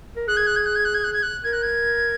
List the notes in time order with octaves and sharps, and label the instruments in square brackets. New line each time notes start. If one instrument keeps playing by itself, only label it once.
[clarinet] A#4
[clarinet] G#4 [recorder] F#6
[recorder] G#6
F#6
G#6
F#6
G#6
F#6
G#6
F#6
G#6
F#6
[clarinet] A#4 [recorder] G#6
[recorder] F#6
G#6